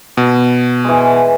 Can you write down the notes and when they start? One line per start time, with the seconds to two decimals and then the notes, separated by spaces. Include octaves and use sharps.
0.17 B2
0.84 E3 G#3